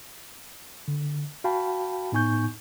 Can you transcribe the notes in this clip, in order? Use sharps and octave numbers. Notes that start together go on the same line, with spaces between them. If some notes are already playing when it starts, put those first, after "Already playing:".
D3
F#4 F5 G5 A5 B5
A2 B3 D#4 G#5 C#6 G6